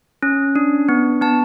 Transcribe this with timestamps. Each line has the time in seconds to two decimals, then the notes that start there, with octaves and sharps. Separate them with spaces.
0.23 C#4
0.56 D4
0.89 B3
1.22 B3 A5